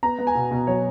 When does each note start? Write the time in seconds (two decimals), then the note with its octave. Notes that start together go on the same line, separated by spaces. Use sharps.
0.03 B3 A#5
0.19 B3
0.27 G#5
0.35 B2
0.51 B2
0.67 F#3 C#5